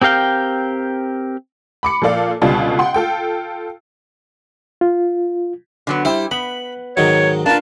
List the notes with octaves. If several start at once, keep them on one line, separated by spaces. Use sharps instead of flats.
C4 G4 A#4 F5 G5
B5 D6 C#7
A#2 F3 A4 D5 F5
C#2 B2 D3 G3 F4 A5
F#5 G5 C6
F4 A4 G5
F4
D3 F#3 B3
G3 E4 G4 C5
B3 B5
G#2 D#3 F#3 C#5
A#3 D4 F4 B4 A5